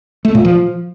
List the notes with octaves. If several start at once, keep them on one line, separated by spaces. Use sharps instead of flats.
A3
A#2
F3